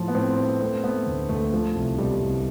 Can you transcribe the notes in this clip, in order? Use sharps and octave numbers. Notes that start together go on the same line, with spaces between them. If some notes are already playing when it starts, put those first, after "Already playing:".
Already playing: A2 F3
B3
A2 C4
B3
A3 C4
A3 B3
D2
D2 A3
F3 A3
C2
B2 G3
C2